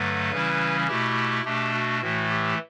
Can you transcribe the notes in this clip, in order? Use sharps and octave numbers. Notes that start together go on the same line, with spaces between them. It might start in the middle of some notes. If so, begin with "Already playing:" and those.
Already playing: G2 D3 F#3 A3 B4
C#3 E3 G3 C#4 E4
B2 A3 E4 G4
B2 A3 D4 G4
F#4
A2 E3 A3 F#4
G4